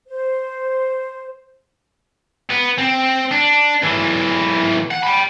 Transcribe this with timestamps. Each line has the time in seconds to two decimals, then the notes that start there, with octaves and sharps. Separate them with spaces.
0.08 C5
2.50 B3
2.79 C4
3.31 D4
3.83 B1 E3
4.91 F#5
5.04 G5 B5